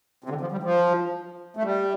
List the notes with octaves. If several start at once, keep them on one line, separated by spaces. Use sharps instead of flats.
C3
D3
F3
G3
F3
A3
G3